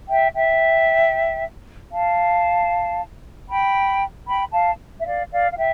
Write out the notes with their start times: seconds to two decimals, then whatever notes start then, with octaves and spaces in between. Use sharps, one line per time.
0.08 E5 G5
0.34 E5 G5
1.91 F5 A5
3.48 G5 B5
4.26 G5 B5
4.52 F5 A5
5.00 E5
5.04 D5 F5
5.30 D5 F5
5.52 F5
5.57 E5 G5